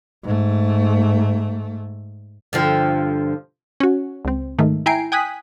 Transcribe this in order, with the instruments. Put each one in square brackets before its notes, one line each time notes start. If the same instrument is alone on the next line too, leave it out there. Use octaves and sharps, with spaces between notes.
[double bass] G#2 A3
[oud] G2 D3 F3
[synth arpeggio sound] C#4 F#4
C#2 C4
G#2 D#3 A3
E4 G5 G#5 A#5 C7 D7
G5 G#5 D#6 F#6 B6